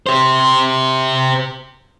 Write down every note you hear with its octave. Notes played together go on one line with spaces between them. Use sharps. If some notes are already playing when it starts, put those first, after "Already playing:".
G4 C5